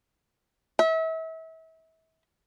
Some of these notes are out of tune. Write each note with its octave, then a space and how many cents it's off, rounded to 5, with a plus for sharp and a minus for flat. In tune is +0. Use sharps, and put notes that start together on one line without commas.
E5 -35